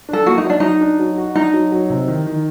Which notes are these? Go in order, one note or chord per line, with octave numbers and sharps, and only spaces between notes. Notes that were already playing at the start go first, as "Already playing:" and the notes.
D4 A4
A#3 F#4
D#4
F#3 D4
F#3 D#4
D4
F#3
F#4
D4 D#4
F#3
F#3
C3
D#3
D#3